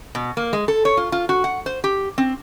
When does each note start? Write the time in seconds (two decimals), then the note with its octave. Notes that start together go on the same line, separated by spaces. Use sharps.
0.15 B2
0.37 A#3
0.53 G#3
0.68 A4
0.85 C#5
0.97 F4
1.12 F4
1.29 F#4
1.44 F#5
1.66 C5
1.84 G4
2.18 C4